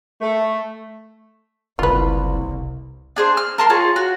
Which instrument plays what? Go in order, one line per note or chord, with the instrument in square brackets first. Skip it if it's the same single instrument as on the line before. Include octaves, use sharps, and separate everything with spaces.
[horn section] A3
[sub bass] F#1 [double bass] C2 [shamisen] F4 B4
[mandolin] D4 G#4 C5
F6
A#4 A5 C6
F4 G#4 C#5
F#4